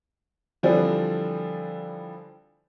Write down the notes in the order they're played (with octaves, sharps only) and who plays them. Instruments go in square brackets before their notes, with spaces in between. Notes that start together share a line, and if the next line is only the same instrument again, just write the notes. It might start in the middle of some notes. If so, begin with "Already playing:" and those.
[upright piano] D3 E3 F3 G3 C4 D4